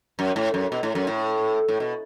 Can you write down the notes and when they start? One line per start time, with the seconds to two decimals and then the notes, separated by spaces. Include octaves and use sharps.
0.19 F#2
0.36 A2
0.54 F#2
0.72 B2
0.83 A2
0.95 F#2
1.07 A2
1.68 A2
1.80 B2